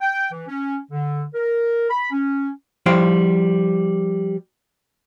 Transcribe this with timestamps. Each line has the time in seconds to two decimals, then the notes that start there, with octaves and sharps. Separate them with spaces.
0.01 G5
0.32 E3
0.48 C#4
0.92 D3
1.34 A#4
1.90 B5
2.11 C#4
2.86 F3 G3 E4 C5 F5 G5